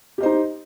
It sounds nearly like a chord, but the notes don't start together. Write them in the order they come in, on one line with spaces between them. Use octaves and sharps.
G4 D#5 C5 D#4